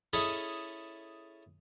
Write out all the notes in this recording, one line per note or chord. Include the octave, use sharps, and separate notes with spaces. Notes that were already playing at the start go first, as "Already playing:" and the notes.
C#4 E4 G#4 A4 D#5